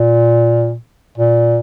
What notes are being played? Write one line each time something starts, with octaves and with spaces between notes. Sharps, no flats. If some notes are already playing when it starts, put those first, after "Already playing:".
Already playing: A#2
A#2